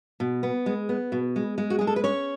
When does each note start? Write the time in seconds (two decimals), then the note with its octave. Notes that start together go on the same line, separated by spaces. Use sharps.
0.20 B2
0.43 B3
0.66 G#3
0.89 B3
1.12 B2
1.36 G#3
1.58 G#3
1.70 F#4
1.79 G#3 G#4
1.87 A4
1.96 B4
2.04 C#4 C#5